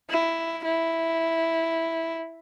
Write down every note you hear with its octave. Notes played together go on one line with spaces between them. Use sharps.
E4
E4